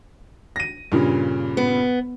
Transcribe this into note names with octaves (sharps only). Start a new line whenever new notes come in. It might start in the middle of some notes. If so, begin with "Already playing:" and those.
A#6 D#7
G2 A#2 C#3
B3